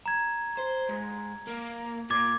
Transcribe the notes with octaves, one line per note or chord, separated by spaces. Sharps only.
A#5 G#6
C5
G#2
A#3
A#2 D6 G#6 A6